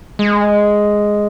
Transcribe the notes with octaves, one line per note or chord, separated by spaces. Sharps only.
G#3